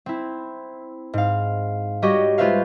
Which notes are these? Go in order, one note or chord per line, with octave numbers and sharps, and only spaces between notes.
C4 E4
G#2 F5
G3 F#4 G4 C#5 D#5
G#3 F4 B4 C5 E5 F5